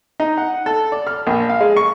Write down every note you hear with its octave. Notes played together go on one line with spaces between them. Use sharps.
D#4
F#5
A4
D5
F6
A#1
F5
G#3
C#6